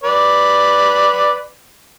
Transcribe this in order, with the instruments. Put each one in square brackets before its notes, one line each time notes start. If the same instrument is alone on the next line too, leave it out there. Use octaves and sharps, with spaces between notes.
[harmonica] B4 D5